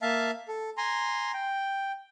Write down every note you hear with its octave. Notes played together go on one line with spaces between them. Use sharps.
A#3 E5 F5 A5
A4
G#5 A#5 C6
G5